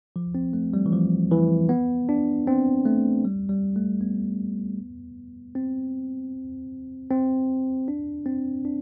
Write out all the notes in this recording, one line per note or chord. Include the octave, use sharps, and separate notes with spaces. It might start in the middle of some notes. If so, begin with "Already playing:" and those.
F3
C4
A3
G3
E3
F3
E3
B3
D4
C4
A3
G3
G3
A3
B3
C4
C4
D4
C4
D4